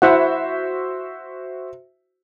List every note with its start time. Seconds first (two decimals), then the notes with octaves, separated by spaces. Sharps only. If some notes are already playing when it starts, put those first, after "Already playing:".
0.02 E4 F#4 C5 E5 F#5